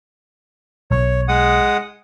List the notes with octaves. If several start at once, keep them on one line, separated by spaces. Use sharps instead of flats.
B1 C#5
G#3 F#5 D#6